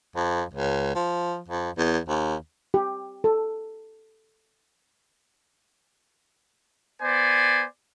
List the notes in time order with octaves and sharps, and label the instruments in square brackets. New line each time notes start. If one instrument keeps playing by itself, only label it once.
[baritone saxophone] F2
C#2
F3
F2
E2
D#2
[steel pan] G4
A4
[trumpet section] B3 C5 D5 G#5